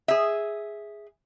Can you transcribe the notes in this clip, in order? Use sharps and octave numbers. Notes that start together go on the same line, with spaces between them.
G#4 E5